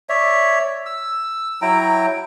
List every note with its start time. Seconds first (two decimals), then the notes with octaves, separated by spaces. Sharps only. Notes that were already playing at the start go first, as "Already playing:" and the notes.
0.09 C#5 D5 E5
0.86 E6
1.62 F#3 E4 G5 A#5